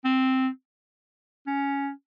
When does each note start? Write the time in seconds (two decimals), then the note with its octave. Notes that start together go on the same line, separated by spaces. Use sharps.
0.05 C4
1.47 C#4